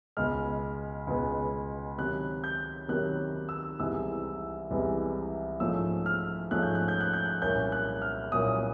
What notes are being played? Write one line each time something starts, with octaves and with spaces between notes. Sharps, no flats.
C#2 B2 G#3 B3 F6
C#2 B2 G#3 B3
C3 D#3 F#3 F#6
G6
C3 D#3 F#3 F#6
E6
C2 C3 E3 G#3 B3 E6
C2 C3 E3 G#3 B3
G#2 F3 A3 C#4 E6
F6
G#2 F3 A3 C#4 F#6
G6
F#6
G6
F#6
G6
F#6
C2 A#2 F#3 A#3 C#4 G6
F#6
F6
C2 A#2 F#3 A#3 C#4 D#6